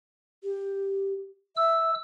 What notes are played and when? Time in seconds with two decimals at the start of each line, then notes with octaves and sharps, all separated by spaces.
0.44 G4
1.57 E5 E6